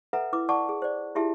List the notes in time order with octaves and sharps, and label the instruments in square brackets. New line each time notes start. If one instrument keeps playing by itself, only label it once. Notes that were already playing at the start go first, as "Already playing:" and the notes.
[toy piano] A4 B4 E5 F#5 A#5
E4 B4 D6
D5 F#5 A5 C#6 D6
G#4
C5 D5
E4 F4 G4 G#4 E5 A5